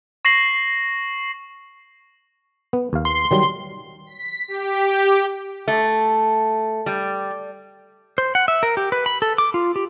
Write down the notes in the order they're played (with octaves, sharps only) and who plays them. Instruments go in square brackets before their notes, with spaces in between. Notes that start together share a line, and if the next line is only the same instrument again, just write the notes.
[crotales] C#6 A#6 C7 F#7
[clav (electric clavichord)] B3
D#2 F5
[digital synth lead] C6
[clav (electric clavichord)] D#3 F#3 G3
[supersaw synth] B6
G4
[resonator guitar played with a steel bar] A3
G3
[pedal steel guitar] C5
F#5
E5
A#4
G4
B4
B5
A4
D6
F4
G4